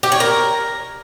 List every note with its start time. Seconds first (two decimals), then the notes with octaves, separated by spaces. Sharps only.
0.03 G4
0.12 C#5
0.20 A#4